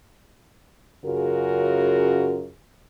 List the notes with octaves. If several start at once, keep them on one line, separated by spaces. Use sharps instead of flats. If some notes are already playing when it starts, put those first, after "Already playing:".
F#2 C#3 F4 F#4 G#4 A#4